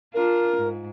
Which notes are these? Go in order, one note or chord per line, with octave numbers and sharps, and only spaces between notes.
D4 F4 A#4
G#2